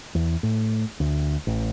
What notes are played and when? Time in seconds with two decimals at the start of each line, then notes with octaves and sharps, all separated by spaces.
0.15 E2
0.43 A2
1.00 D2
1.47 A1